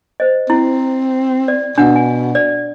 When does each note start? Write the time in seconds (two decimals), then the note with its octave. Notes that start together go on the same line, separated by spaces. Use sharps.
0.20 C5 D#5
0.50 C4 E4
1.48 D5
1.78 B2 D4 F#5
1.96 G#5
2.35 D5